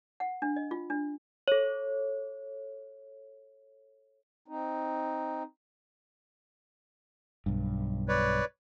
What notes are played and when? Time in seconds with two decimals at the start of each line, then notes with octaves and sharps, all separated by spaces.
0.20 F#5
0.42 D4
0.56 D#5
0.71 F4
0.90 D4
1.48 A4 C#5
4.48 C4 D#4
7.46 B1 G2
8.09 B4 C#5 D5